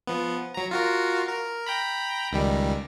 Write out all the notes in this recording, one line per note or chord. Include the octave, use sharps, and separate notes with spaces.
F3 B3
F#3 A#5
F4 F#4 A#4
A#4
G5 A#5 B5
C#2 D#3 G3